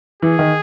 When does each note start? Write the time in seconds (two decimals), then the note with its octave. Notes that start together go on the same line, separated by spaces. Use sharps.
0.22 E3 G#4
0.39 D#3